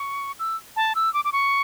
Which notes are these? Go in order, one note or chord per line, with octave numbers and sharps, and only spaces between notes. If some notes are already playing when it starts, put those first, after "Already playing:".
Already playing: C#6
E6
A5
E6
D6
D6
C#6